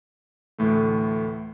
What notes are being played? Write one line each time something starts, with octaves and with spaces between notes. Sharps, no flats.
D2 A2 E3 A3